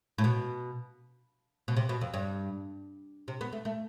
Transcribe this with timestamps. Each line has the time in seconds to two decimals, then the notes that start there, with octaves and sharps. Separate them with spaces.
0.18 A2
0.24 B2
1.68 B2
1.76 C3
1.89 B2
2.01 F2
2.14 G2
3.28 C3
3.41 B3
3.53 A3
3.65 A3